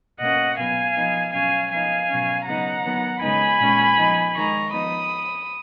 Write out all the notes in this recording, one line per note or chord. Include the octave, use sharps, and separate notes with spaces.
B2 A#3 C#4 D#5 F#5
B2 F#3 B3 F5 G#5
F3 B3 D#4
B2 F#3 C#4 F5 G#5
F3 B3 D#4 F5 G#5
B2 F#3 C#4
C#3 F#3 B3 D#4 F#5 A#5
D#3 F#3 B3
C#3 G#3 B3 D#4 G#5 B5
A#2 G#3 C#4
F3 B3 D#4
D#3 G#3 D#4 A#5 C#6
F3 B3 D#4 B5 D#6